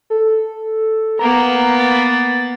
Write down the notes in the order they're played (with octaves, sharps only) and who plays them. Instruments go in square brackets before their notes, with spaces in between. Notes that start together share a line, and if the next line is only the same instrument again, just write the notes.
[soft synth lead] A4
[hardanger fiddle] A#3 B3 [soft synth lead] A#5
[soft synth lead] A6